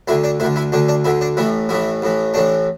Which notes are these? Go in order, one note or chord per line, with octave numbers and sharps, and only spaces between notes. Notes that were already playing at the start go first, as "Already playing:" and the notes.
D2 D3 E4
D4
D2 D3 E4
E4
D2 D3 D4
D4
D2 D3 E4
D4
A1 A2 E3 E4
A1 A2 E3 E4
A1 A2 E3
A1 A2 E3 D4